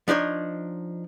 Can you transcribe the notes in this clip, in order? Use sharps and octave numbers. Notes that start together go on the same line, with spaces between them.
F3 D4 D#4 C#5